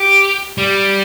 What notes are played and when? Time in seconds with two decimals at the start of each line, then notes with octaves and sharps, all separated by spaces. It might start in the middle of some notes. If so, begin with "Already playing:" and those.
Already playing: G4
0.58 G3